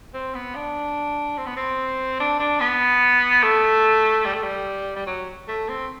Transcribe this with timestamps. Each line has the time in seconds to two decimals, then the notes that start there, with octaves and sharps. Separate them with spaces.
0.14 C4
0.34 B3
0.55 D4
1.38 C4
1.46 B3
1.56 C4
2.20 D4
2.40 D4
2.60 B3
3.43 A3
4.25 G3
4.34 A3
4.43 G3
4.96 G3
5.07 F#3
5.48 A3
5.69 C4